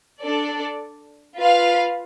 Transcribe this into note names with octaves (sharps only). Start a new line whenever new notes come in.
D4 A4 D5
F4 B4 F5